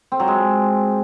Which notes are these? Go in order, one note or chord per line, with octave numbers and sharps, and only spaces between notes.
C4
F#3
G#3